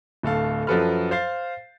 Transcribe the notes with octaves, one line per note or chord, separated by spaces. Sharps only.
D1 A3 A4 F5
F#2 F3 F#3 A4 B4 F6
C5 F5 A6 C7